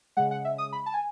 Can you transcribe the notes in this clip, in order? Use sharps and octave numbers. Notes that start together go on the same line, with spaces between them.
C#3 G#3 F#5
F#5
E5
D#6
B5
A5
G#5